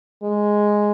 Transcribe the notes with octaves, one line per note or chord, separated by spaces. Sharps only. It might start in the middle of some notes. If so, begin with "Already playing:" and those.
G#3